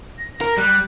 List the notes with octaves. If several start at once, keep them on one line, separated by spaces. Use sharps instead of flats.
A#6
A#4
G3 F#6